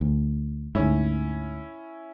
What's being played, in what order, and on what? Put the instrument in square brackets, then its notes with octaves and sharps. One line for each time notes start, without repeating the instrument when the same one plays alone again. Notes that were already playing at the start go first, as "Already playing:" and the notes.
[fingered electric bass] D2
[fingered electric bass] D2 G#2 [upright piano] C#4 E4